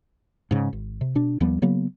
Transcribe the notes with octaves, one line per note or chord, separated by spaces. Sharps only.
G#2 C#3
G#1
C3
B2 D4
D#2 F3 G3 B3
C#3 F#3 A#3 B3